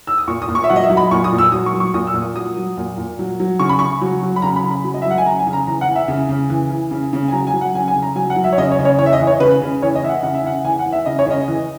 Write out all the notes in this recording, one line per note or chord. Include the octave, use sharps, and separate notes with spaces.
E6
D#6
A#2 C#6
D#6
A#2
C#6
E5
F#3 F#5
D#5
E5
F#3
B5
A#2 C#6
D#6
A#2
E6
F#3 D#6
C#6
F#3
C#6
A#2 D#6
E6
A#2
D#6
F#3 D#6
F#3
A#2
A#2
F#3
F#3
C#3 C#6
B5
C#3 C#6
F#3
F#3
B5
C#3 A#5
B5
C#3
B5
F#3
D#5
E5
F#3
F#5
G#5
C#3 A#5
G#5
C#3
A#5
E3 A#5
F#5
E3
E5
C#3
C#3
E3
E3
C#3
C#3
G#5
F#3 A#5
G#5
F#3
F#5
C#3 G#5
G#5
C#3
A#5
F#3 G#5
F#5
F#3
E5
C#5
C#3 D#5
C#5
C#3
C#5
E3 C#5
E5
D#5
E3
C#5
C#3 B4
C#3
E3 C#5
D#5
E3 E5
F#5
C#3 F#5
E5
C#3 F#5
E3 G#5
F#5
E3
E5
C#3 D#5
C#5
C#3 D#5
E3